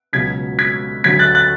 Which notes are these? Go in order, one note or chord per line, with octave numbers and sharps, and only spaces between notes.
C#2 B2 F#3 G#6 B6
G#6 B6
D2 D3 F#3 G#6 B6
F#6 A6
F#6 A6